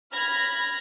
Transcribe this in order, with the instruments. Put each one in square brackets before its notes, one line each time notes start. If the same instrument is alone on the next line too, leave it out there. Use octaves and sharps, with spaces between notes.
[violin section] B5 F6 G#6 A#6